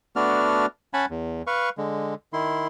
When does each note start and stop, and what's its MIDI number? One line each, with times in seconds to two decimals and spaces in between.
0.16 0.66 57
0.16 0.66 59
0.16 0.66 62
0.16 0.66 66
0.16 0.66 74
0.16 0.66 89
0.94 1.06 61
0.94 1.06 78
0.94 1.06 80
0.94 1.06 81
0.94 1.06 83
1.10 1.42 40
1.47 1.69 71
1.47 1.69 77
1.47 1.69 85
1.78 2.14 50
1.78 2.14 56
2.33 2.67 51
2.33 2.67 64
2.33 2.67 84